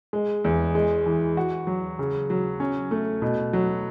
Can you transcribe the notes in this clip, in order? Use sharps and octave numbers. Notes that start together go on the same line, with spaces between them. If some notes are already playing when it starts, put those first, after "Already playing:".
G#3
E2
G#3
E3
F#4
F#3
C#3
F#3
C#4
A3
B2
F#3